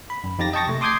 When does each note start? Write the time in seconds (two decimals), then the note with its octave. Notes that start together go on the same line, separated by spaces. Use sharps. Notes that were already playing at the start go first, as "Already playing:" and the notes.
0.10 B5
0.24 F#2
0.39 F2 D#4 G4 A6 A#6
0.53 D#5 G5 A5 C#6 A6 A#6
0.68 C3 A3
0.81 C6 D6 D#6 G6 G#6 C7